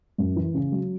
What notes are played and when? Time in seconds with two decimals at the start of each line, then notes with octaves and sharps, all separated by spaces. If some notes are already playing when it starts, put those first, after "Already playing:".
0.18 F#2
0.36 E3
0.54 C#3
0.72 F#3